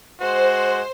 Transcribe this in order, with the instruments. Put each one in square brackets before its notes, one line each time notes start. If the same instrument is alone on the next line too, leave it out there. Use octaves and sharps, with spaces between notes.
[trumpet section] G#3 F#4 [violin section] C5